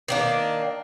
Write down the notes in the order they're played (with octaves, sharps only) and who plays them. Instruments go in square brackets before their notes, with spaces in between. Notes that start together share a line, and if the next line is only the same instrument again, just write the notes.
[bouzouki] D#3 A#3 D4